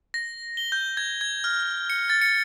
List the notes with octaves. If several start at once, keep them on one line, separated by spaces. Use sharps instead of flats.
A#6
G7
G6
G#6
G#6
F6
C#7
A6
C#7